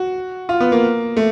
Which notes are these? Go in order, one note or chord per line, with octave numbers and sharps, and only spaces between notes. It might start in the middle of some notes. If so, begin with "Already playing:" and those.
Already playing: F#4
F4
B3
A#3
A3